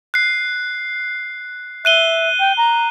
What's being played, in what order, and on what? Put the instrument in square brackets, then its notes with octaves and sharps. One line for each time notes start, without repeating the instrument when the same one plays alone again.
[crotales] F#6 C7
[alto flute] E5 [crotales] F#6 D#7 G7
[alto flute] G5
A#5